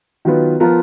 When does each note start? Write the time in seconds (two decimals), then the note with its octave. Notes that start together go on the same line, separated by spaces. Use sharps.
0.25 D#3 F#3 B3 F4 B4
0.60 F3 B3 F4 A#4